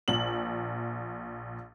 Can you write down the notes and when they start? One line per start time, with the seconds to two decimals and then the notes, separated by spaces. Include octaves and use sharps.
0.08 A#1 F#7